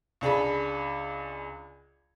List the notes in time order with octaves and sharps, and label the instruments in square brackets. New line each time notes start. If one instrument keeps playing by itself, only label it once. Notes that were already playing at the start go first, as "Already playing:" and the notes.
[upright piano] C#2 D4 G#4 B5